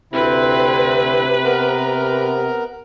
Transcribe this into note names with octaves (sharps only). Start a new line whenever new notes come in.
D2 C3 C4 E4 B4
B3 A#4